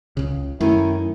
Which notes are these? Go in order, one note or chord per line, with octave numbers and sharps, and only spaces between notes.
C#2 C#3
F#2 D#3 A3 C#4 E4